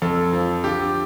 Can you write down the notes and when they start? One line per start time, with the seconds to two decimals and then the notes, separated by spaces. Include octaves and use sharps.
0.02 F2 A4
0.33 F3
0.64 D3 G4